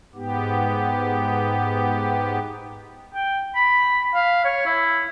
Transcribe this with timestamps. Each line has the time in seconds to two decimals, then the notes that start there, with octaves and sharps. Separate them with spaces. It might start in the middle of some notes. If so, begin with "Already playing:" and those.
0.15 G#2 B3 G4
3.14 G5
3.56 B5
4.15 F5
4.45 C#5
4.66 E4